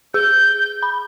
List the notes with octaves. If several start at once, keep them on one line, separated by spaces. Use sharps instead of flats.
G#4 G6
B5